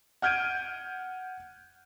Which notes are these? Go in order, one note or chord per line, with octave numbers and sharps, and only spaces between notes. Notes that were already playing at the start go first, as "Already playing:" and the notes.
F#5 F6 G6 G#6 D7 D#7